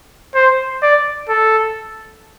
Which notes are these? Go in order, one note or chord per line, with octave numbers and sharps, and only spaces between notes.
C5
D5
A4